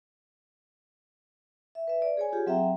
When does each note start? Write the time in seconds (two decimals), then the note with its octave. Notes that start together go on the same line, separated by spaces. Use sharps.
1.75 E5
1.87 B4 E5
2.02 D5
2.17 G#4 C#5 G#5
2.33 F4 G4 G#4
2.47 F#3 C4 E5 F#5 G5 A#5